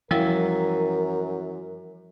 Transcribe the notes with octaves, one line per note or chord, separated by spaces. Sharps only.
F#2 E3 F3 G3 E4 A#4